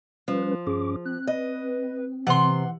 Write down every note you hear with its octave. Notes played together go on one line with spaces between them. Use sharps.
F3 G3 C#4 B4
G2 C#4 G#4 D6
C4 F#6
B4 D#5
C3 E3 F#5 C6